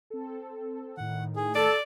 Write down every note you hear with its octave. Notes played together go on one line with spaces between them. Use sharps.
C4 A4
A2 D#3 F#5
G#4
A4 D5 A5